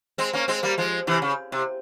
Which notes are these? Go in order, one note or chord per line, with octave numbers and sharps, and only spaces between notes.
G#3 C4
A#3 C#4
G#3 C4
G3 A#3
F3 G#3
C3 E3
C#3
C3